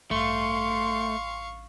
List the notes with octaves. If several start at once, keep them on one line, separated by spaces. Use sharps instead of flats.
A1 G2 A3 F5 C6 C#6